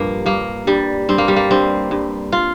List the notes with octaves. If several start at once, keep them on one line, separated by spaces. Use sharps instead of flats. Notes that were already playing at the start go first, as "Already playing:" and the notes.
Already playing: G2 A#2 F3 A#3
G2 A#3
G2 G3
G2 C4
A#3
G3
A#3
G2 C4
G2
F4